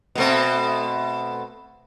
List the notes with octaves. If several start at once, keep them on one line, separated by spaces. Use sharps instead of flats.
B2 A3 C4